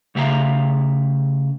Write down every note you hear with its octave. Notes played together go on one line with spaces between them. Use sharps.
C#3 A3 G4 E5 F5 A#5